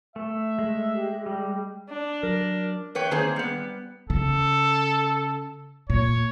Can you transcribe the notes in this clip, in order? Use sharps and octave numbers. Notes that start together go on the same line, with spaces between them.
A3 E5
G#3
G4
G3 G5
D4
F#3 A#4
E2 B4 C#5 G5
D#3 A#3 C4 G#4 C5
G3 B3
C#3 A4
A#2 C#5